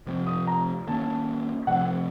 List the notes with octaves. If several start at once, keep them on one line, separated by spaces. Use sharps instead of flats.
C3 F3 C4
D#6
A#5
D#3 A#3 C#4 A5
C3 F3 A3 C4 F#5